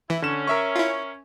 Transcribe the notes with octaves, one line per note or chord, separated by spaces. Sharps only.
E3 E4
D3 C#4 E7
A#4 E5 C#6
E4 F4